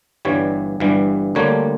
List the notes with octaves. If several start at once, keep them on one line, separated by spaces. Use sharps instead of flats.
G1 G2 E3 G3 C#5
G1 G2 E3 G3
D2 D3 G3 A#3 C#5